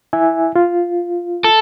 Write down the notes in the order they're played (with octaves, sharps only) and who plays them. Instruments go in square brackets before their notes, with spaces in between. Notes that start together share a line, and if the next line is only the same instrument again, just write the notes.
[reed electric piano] E4 E5 G#5
F4
[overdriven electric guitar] A4